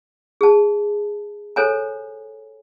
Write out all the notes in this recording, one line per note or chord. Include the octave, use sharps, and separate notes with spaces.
G#4 A5
A4 C5 C#5 G#5 A#5